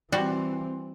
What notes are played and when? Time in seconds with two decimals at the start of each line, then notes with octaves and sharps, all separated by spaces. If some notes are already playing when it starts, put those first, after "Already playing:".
0.12 E3 G3 C4 F#4